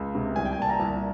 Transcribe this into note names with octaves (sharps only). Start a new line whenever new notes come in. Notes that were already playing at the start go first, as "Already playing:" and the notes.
Already playing: C#2
C3
C2 G#5
G5
G#5
A#2 A5
A#5
C2